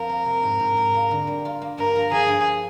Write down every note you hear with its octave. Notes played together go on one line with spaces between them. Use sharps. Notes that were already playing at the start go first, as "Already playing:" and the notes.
Already playing: F2 F3 A#4
A#3
C3
G#2
G#2
G#2
A#3
D3
G3
F4
A#3
G2 A#4
F3
F3 G#4
G2